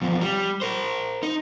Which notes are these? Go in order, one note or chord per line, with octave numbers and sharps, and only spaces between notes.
E2 F3
G3
A#4 C5
D#4